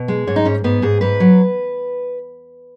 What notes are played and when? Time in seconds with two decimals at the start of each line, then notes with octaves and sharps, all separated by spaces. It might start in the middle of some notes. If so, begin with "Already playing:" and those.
Already playing: B2
0.08 G#3
0.27 G#2 C#5
0.36 D#4
0.45 G#2 C#4
0.64 G#2 B3
0.82 G#2 G#4
1.01 G#2 B4
1.20 F#3